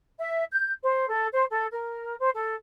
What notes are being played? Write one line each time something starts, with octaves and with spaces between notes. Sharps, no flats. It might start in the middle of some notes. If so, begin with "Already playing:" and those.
E5
G6
C5
A4
C5
A4
A#4
C5
A4